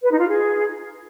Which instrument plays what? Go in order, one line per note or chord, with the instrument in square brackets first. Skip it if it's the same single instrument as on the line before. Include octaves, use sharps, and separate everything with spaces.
[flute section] B4
D#4
F4
G#4